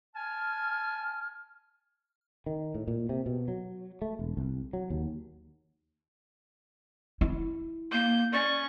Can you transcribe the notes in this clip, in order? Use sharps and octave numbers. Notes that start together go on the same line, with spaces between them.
G#5 A5 F6
D#3
A2
A#2
C3
B2
F#3
A3
E1
C2
F#3
D#2
E4
A#3 G6
C#4 D5 C#6